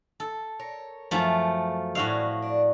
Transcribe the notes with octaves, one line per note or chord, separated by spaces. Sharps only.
A4
A#4 C#5
F#2 F3 A3
A2 E3 G3 F#4 F5
D4